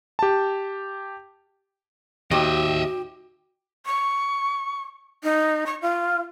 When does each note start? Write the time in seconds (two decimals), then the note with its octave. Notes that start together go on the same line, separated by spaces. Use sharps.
0.19 G4 A5
2.31 D#2 F#4 D#5 E5 G5 D6
3.86 C#6
5.23 D#4
5.66 C#6
5.82 F4